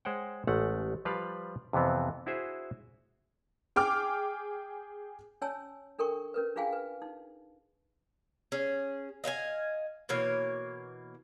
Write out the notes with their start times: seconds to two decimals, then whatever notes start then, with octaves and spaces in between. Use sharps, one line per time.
0.05 G#3 C5 C#5 F#5 G5
0.47 A1 G#3 A3 F#5
1.05 F3 G3 B4 D5 F5
1.73 F2 C3 E3 B3 C4
2.26 D4 E4 F#4 G#4 C5 E5
3.76 G#4 G5 D6 F6
5.42 C#4 C#5 G#5 A5 E6
5.99 D4 A4 A#4 G5 C#6
6.34 C#4 A#4 B4
6.56 D4 F4 G#4 F5 G5 G#5
6.73 B4
7.02 D#4
8.52 C#4 G#4
9.24 D#5 F5 G5 G#5
10.09 B2 E3 A#3 C#5